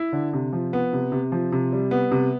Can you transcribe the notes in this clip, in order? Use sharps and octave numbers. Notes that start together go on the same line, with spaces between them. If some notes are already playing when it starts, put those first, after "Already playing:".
Already playing: E4
D3
C3
F3
B3
C3
C3
F3
C3
G3
B3
C3